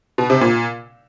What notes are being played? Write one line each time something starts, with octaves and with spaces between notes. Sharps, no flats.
B2
C3
A#2